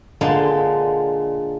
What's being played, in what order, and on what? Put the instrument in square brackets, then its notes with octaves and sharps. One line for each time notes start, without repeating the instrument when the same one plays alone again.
[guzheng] A#2 D3 G#3 F5 C6